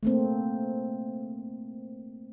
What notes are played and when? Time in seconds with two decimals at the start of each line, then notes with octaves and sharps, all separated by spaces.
0.03 A3 A#3 C4